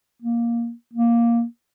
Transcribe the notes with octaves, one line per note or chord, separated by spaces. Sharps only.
A#3
A#3